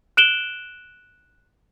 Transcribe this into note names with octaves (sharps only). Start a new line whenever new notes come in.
F#6 D7 E7 F#7 G7